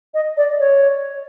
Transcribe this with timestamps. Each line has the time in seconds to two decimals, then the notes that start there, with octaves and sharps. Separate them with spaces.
0.14 D#5
0.37 D5
0.60 C#5